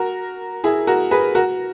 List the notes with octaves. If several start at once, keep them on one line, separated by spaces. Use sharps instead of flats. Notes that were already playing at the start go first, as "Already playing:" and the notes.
Already playing: F#4 A#4
E4 G#4
F#4 A#4
G#4 B4
F#4 A#4